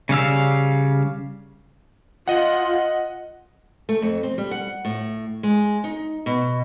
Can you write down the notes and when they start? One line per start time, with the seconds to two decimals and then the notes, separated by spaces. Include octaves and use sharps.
0.09 C#3 G3 F5 E6
2.28 F4 D#5 F#5
3.89 A3
4.02 F2
4.23 C4
4.38 G3
4.51 F#5
4.85 A2
5.43 G#3
5.84 D#4
6.26 B2